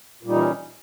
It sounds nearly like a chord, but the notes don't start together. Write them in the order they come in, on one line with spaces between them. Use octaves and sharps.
A#2 G3 D#4 E3 C#4